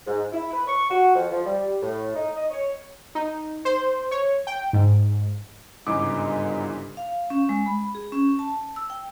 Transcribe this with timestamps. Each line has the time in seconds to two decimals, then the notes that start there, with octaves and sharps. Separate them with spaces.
0.06 G#2
0.32 E4
0.52 B4
0.68 C#6
0.90 F#4
1.15 F2
1.31 F3
1.45 G3
1.81 A2
2.15 D#4
2.36 D#5
2.51 C#5
3.15 D#4
3.65 C5
4.11 C#5
4.47 G5
4.73 G#2
5.87 G1 G#2 C#3 E3 G#3 D#4 D6
6.97 F5
7.30 C#4
7.49 G#3
7.66 B5
7.95 G#4
8.12 C#4
8.39 A5
8.76 E6
8.90 G5